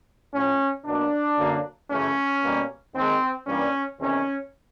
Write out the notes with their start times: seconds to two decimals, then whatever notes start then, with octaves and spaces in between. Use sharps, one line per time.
0.34 A2 F3 A3 C#4
0.85 B2 F#3 A#3 D4
1.37 F#2 D3 F#3 A#3
1.90 F#2 C#3 E3 A3 C#4
2.43 B2 G3 A#3
2.94 D#2 D#3 G#3 C4
3.46 G2 E3 G3 A#3 C#4
3.99 E2 C3 D#3 C#4